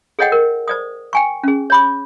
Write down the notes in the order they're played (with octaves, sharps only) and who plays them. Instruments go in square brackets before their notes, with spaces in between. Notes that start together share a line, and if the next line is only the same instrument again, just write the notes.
[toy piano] G#4 A4 C#5 D#5 F#5 G5
A#4
C5 D5 D#6
G5 G#5 C#6
C#4 G#4
C#5 B5 D6